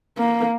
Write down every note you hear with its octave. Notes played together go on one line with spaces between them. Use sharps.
A#3